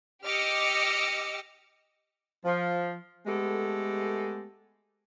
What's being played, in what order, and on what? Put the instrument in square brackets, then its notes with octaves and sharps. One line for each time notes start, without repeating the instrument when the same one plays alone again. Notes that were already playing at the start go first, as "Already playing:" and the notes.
[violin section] G4 D#5 D6 E6 F6 C#7
[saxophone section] F3
G#3 A3 B3 G4 A4